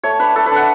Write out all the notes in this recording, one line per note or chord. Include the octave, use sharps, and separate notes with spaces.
A3 C#5
D4 B4
A3 A4
B4
D4 F#5